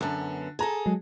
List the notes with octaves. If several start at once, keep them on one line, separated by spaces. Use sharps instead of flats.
F#2 D3 B3 A5
G#4 A4 A5 A#5
F#3 G#3